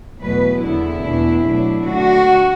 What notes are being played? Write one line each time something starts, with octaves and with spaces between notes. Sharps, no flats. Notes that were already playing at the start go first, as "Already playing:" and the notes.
E2 B2 F#3 A3 B4
E2 D3 B3 E4
E2 B2 A3 D4
B2 F#3 A3 D4
D3 A3 D4 F#4